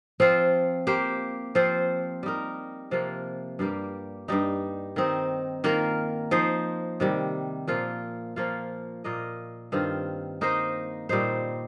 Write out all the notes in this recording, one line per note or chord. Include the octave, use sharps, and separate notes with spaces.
F3 C4 F4 C5
A#3 G4 C5
F3 C4 F4 C5
G3 D#4 A#4
C3 F3 A#3 F4
G2 G3 A#3 G4
G2 G3 D#4
D#3 C4 D#4
D#3 A#3 F4 A#4
F3 D#4 C5
C3 D#3 G3
A#2 F3 A#3 F4
F3 A#3 F4
A#2 A#3 F4 D#5
G2 D#3 C4 F4
A#3 D#4 C5 D#5
A#2 G3 D#4 C5